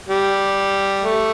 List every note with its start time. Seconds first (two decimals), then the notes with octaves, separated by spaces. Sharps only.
0.09 G3
1.02 A3